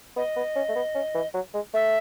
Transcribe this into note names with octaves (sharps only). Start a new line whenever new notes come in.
B3 D#5
B3
C#4
A3
B3
C#4
E3
F#3
G#3
A3 E5